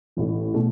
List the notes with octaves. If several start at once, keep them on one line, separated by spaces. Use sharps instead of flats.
A1 A2 E3
B2 A3